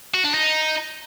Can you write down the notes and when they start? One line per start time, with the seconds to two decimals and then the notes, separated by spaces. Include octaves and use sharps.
0.14 F#4
0.24 D4
0.34 D#4